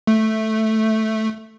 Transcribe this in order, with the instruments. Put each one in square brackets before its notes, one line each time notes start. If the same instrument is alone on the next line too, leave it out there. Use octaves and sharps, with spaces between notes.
[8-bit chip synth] A3